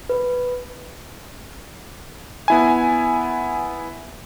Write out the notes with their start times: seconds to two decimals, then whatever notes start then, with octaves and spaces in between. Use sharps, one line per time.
0.10 B4
2.48 B3 E4 G#5